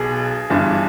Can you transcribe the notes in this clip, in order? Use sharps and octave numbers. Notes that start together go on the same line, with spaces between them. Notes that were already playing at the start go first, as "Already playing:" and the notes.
Already playing: B1 B2 G#4
G1 G2 E3